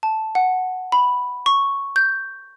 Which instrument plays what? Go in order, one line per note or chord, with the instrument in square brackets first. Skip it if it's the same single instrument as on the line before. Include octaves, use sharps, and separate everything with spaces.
[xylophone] A5
F#5
B5
C#6
G6